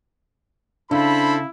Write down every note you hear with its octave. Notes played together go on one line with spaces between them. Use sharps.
C#3 D4 E4 A4 C5 B5